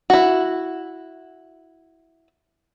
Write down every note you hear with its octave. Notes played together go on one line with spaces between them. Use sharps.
E4 F#4